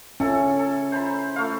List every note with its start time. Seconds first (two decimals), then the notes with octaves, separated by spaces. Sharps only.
0.20 C#4 E4 A4
0.59 A4
0.92 C5 A#5 B5
1.36 A3 F5